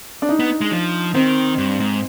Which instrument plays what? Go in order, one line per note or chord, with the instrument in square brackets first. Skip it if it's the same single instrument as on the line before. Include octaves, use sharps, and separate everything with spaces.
[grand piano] D4
D#4
[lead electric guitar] B3
G#3
F3
[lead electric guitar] D#3 [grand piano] C4
[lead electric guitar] G2
G#2